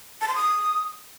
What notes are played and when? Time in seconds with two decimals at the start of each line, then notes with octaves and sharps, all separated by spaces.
0.21 A5
0.28 C6
0.35 D#6